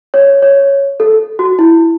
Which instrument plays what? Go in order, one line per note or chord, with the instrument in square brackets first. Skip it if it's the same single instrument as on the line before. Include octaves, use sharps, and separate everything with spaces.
[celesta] C#5
C#5
A4
F#4
E4